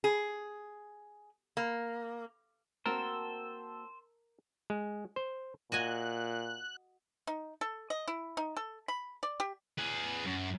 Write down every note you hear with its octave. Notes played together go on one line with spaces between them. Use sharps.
G#4
A#3
A#3 C4 F#4 A#4 C5 A5 E6
G#3
C5
A#2 F#4 D#5 G#5 F#6
D#4
A4
D#5
E4
D#4
A4
B5
D5
G4
G#4 B4
F#2